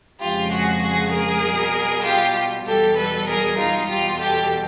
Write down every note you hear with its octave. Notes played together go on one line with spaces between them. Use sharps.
F2 C#3 F3 G#3 F4 G4
F#4 G#4
F#4 G#4
G#4 A#4
B2 G3
F4 G4
E2 B2 G3 G4 A4
A4 B4
G#4 A#4
D#4 F4
E2 B2 G3 F4 G4
G4 A4